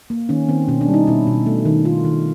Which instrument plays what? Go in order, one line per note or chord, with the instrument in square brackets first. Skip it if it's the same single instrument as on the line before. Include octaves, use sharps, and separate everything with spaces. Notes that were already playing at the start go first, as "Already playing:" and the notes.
[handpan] A#3
D#3 C#4
D#3 C4
B2 C#4
D4
G3
D#4
B2 E4
B2
A3
D#3
D#3 F4
D#3